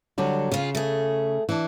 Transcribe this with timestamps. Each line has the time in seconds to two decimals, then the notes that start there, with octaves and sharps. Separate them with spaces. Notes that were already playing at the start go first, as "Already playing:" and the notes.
0.18 D3 F#3 G3
0.52 C#3 F4 G#4
0.75 A3 G#4
1.49 E3 D4